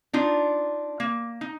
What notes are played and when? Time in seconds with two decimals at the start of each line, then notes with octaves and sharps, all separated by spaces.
0.13 D4 D#4 F4
1.00 A#3
1.41 D#4